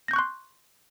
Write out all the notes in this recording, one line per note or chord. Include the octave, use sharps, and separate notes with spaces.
C6 C#6 F#6 G6 A#6